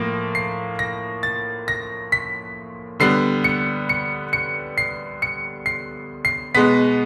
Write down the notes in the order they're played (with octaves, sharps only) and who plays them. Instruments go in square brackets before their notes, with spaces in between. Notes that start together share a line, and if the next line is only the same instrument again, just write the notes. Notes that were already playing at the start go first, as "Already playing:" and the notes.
Already playing: [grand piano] A2 F3 A#3 A#6
C7
A#6
A6
A#6
B6
D3 G3 B3 C7
C#7
C#7
C#7
C7
C#7
C7
C7
B2 G#3 B3 B6